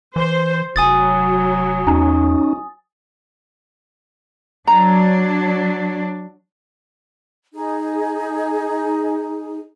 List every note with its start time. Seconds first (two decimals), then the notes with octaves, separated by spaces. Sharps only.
0.16 E3 C5
0.76 F1 F#3 G#5 D#6 A6
1.87 E2 C#4 D#4
4.67 F#3 D4 A#5
7.53 D#4 G#4